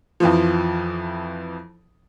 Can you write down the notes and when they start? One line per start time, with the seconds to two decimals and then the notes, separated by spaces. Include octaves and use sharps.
0.20 F2 E3 F3